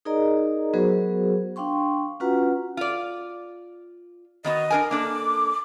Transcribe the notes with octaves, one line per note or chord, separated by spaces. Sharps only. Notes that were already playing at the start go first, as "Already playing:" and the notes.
D#4 G#4 A#4 D5 D#5 A#5
F#3 B3 F#4 G#4 A#4 C5
D4 F5 G5 C6 C#6
C#4 F4 F#4 B4 F#5 A#5
F4 D5
D#3 B3 F#4 D#5
D4 A#4 G#5
A#3 D4 A4 D6